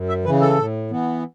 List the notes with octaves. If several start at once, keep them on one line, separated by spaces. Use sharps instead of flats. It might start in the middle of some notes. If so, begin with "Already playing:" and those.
Already playing: F#2
E5
C#3 E3 B4
A4
A2
E3 B3